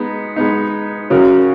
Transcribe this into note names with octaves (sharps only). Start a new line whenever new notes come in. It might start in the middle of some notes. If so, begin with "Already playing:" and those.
Already playing: G#3 B3 D#4
G#3 B3 D#4
C#3 F#3 C#4 F#4 A#4